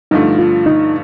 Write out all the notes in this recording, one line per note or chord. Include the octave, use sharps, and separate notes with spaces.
G2 D3 F3 A3 D#4
F4
D#4